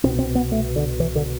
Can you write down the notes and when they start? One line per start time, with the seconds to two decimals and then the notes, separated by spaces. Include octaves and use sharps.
0.04 C2 B2 C4
0.19 C4
0.35 B3
0.52 A3
0.76 D3
1.00 E3
1.16 D3